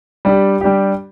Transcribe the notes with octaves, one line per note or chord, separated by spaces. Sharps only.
G3 D4 G4
G3 D4 G4